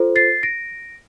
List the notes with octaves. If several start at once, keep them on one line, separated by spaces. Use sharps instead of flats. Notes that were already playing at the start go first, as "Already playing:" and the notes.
Already playing: F4 A4 C5
A6 C7
A#6 D7